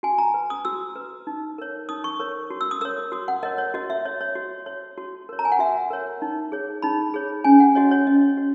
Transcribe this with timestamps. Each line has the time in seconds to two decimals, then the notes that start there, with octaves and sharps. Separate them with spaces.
0.03 F#4 G#5
0.18 A#5
0.34 B4
0.50 D#6
0.65 F#4 E6
0.96 B4
1.27 D#4
1.58 A#4 C#5
1.89 D#4 D#6
2.04 C#6
2.20 A#4 C#5
2.50 F#4
2.61 E6
2.71 D#6
2.81 A#4 C#5 E6
3.12 F#4 D#6
3.28 F#5
3.43 A#4 C#5 D#5
3.58 C#5
3.74 F#4 D#5
3.90 E5
4.05 C#5 D#5
4.21 C#5
4.35 F#4
4.66 C#5
4.98 F#4
5.29 A#4 C#5
5.39 A#5
5.45 G#5
5.52 F#5
5.59 F#4 E5
5.90 A#4 C#5
6.22 D#4
6.52 G#4 C#5
6.82 D#4 B5
7.14 G#4 C#5
7.44 C#4 G#5
7.60 F#5
7.75 F#4 C#5 D#5
7.91 C#5
8.07 C#4 D#5
8.37 F#4 C#5